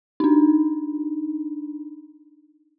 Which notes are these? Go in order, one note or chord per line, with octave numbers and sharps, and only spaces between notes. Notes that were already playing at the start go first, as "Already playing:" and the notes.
D4 D#4